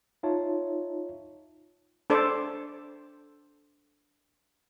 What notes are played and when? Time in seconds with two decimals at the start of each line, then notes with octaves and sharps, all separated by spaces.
0.23 D#4 F4 C#5 E5 A5
2.10 D4 A4 C5 D5